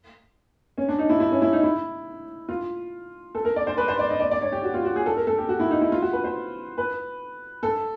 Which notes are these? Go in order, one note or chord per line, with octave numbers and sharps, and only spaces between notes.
C#4
D4
D#4
E4
E4
C#4
E4
D#4
E4
F4
A4
A#4
D5
C5
B4
C5
D5
D#5
D5
D5
C#5
G4
F#4
F4
F#4
G#4
A4
A#4
A4
G4
F#4
E4
D#4
E4
F4
F#4
B4
C5
B4
A4